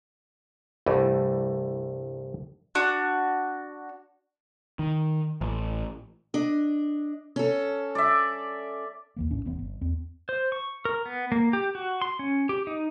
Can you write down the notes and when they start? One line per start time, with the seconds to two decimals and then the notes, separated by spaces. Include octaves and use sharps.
0.86 C2 G2 E3 A3
2.75 D4 F#4
4.79 D#3
5.41 A1
6.34 D4 D#5
7.36 C#4 A4
7.95 D5 E5
9.16 D#2 E3 A#3
9.31 B1 A2 C#4 D4
9.45 E1 E3 B3 C4
9.59 G1
9.81 E2 C4
10.29 C5
10.52 C#6
10.85 A#4
11.06 B3
11.32 A#3
11.53 G4
11.75 F#4
12.01 C6
12.19 C#4
12.49 G4
12.67 D#4